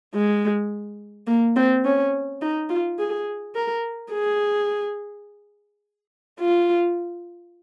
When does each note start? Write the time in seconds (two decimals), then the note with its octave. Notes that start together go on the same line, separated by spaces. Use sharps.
0.14 G#3
1.27 A#3
1.56 C4
1.85 C#4
2.41 D#4
2.70 F4
2.99 G#4
3.55 A#4
4.12 G#4
6.40 F4